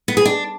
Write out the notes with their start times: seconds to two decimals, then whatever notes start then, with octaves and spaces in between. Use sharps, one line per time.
0.08 B3
0.17 G#4
0.25 D4